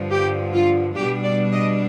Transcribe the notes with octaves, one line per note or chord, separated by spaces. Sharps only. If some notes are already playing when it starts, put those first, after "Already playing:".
Already playing: G2 D3 F3
G4
F4
B2 G3 D4 G4
D5
D#5